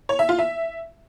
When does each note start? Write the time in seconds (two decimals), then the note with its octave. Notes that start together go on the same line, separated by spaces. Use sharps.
0.09 C#5
0.19 E5
0.29 F4
0.39 E5